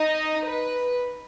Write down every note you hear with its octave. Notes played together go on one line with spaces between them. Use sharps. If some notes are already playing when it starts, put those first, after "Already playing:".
Already playing: D#4 D#5
B4